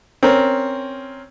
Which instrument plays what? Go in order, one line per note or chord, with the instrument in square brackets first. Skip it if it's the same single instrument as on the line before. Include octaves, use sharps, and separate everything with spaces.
[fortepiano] C4 C#4 A#4